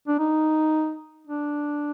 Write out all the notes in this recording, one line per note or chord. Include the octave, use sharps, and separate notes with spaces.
D4
D#4
D4